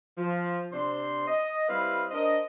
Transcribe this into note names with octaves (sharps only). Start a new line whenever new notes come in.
F3
C3 C4 D4 C5 C6
D#5
G3 C4 E4 B4 D#5 F5
D4 A#4 C5 D#5